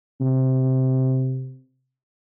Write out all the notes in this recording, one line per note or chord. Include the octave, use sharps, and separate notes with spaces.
C3